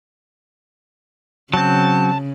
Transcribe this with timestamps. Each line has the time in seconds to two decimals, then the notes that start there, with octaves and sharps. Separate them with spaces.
1.54 C#3 F#3 C4 A5